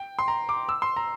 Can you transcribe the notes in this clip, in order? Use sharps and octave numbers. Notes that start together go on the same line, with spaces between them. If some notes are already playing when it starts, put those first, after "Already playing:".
Already playing: G5
C6
A#5
D6
E6
C6
A#5